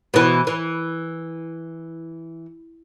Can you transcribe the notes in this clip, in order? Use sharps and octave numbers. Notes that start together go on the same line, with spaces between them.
B2 E3
E3